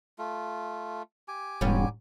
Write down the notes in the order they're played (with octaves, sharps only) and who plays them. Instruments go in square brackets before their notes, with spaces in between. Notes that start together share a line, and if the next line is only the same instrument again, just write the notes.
[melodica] A3 F4
G4 G#5 D6
[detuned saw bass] E1 [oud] G#2 G3 C#4